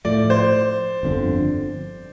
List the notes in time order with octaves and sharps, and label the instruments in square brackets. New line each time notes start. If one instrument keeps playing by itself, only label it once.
[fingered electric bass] A2 F3 A3 [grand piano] D5
[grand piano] C5
[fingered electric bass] G1 F2 D3